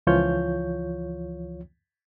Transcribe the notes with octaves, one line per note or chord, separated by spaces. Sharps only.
C#2 E3 F3 F4 C#5 G6